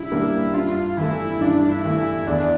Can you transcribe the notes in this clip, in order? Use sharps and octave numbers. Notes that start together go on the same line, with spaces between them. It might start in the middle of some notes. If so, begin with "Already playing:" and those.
Already playing: C#3 G3 D4 E4
G3 A#3 D4
G2 F4
E3 A3 E4
G2 D4
E4
E3 A3
E4
E2 D4